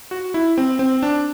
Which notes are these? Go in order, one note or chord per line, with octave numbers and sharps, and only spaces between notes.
F#4
E4
C4
C4
D4